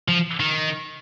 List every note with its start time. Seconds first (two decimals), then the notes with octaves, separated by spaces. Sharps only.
0.08 F3
0.40 D#3